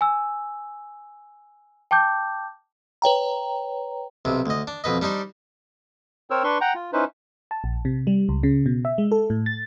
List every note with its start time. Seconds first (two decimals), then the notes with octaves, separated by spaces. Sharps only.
0.01 G#5 E6
1.91 G5 A5 D6 G6
3.02 B4 C#5 G5 A#5
4.25 B1 C3
4.46 D2 D#5
4.67 D4
4.84 F2 B2 B4 D#5
5.02 G3 D4 D#4 C5
6.30 C4 A#4 C5 C#5 E6
6.44 D4 B4 C6 C#6
6.61 F#5 G5 A#5
6.75 F4
6.93 C#4 D#4 E4 B4 C5
7.51 A5
7.64 A#1
7.85 C3
8.07 G3
8.29 C#2
8.43 C#3
8.66 B2
8.85 E5
8.98 G#3
9.11 A4
9.30 A2
9.46 A6